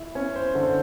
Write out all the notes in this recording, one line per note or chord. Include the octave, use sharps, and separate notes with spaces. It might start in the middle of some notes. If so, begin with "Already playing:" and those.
Already playing: E4
C#4 C#5
C5
D3 C5